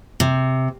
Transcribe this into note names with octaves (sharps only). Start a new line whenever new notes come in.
C3